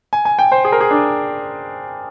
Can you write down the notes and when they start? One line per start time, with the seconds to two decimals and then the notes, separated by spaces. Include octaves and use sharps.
0.13 G#5
0.25 G#5
0.39 G5
0.52 C5
0.65 G#4
0.72 A#4
0.81 G#4
0.91 D4